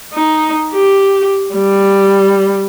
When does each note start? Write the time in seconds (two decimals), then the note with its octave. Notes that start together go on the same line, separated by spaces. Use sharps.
0.14 D#4
0.73 G4
1.55 G3